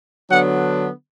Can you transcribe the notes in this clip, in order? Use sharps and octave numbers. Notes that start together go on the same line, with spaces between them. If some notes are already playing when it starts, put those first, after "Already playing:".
D3 F#3 B3 D4 F#5